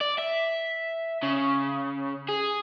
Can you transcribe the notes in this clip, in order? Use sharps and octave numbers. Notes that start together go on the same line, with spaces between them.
D5
E5
C#3
G#4